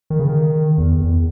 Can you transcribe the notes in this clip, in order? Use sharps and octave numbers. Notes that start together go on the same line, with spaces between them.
D#3
C#3
D#3
E2
E2